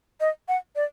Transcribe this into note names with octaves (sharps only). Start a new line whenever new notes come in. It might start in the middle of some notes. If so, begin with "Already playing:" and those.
D#5
F#5
D5